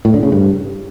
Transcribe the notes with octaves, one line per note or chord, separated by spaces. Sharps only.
A2
D3
C#3
G2